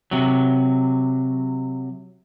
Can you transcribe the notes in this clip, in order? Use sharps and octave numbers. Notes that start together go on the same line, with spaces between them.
C3 F#3